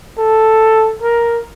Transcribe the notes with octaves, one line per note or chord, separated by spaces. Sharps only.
A4
A#4